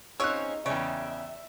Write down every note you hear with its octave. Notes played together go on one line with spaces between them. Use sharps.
C4 C#4 D#4 F4 G#4 C#5 E6 F#6
E2 C#3 C#5 D5 E5 G5